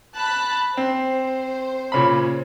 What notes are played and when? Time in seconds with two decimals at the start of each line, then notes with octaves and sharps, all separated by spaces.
0.17 A5 B5 F#6
0.77 C4 C5
1.92 A#2 C#3 B5